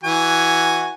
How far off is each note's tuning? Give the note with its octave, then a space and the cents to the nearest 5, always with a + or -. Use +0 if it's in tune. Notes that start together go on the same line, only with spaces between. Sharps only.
E3 +0 F#4 +0 G#5 +0